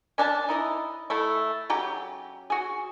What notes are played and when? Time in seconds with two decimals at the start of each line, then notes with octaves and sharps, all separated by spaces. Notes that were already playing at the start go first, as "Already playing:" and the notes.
0.18 C#4 D4 G#5 A5
0.49 D#4 E4 D#5
1.10 A3 E4 A4
1.70 C#3 F#3 G4
2.50 F#4 G#4